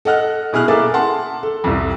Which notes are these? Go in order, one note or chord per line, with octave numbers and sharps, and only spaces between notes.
A4 D#5 F#5 F6 F#6
B2 E4 G#4 F6 F#6
A#3 G#4 A4 E5 D6 A6
F#5 A5 C6
A4
C2 F2